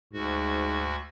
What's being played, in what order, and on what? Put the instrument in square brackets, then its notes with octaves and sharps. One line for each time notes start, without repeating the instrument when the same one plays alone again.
[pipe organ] D2 F#4 [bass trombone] G#2